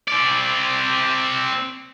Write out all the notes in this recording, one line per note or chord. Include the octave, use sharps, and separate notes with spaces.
C4 D5